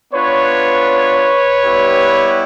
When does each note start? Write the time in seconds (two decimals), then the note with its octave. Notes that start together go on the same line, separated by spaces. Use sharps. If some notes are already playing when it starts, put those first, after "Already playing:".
0.13 B3 D4 F4 B4 C#5
1.64 G3 B3 E4 G4